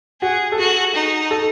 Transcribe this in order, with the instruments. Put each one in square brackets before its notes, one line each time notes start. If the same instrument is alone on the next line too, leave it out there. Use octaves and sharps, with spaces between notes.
[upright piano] F#4 [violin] G#4
[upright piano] A4
[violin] F#4 [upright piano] G#4
[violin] D#4
[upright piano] A4